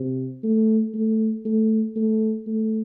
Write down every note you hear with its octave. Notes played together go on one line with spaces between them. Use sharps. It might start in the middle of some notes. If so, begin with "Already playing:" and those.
Already playing: C3
A3
A3
A3
A3
A3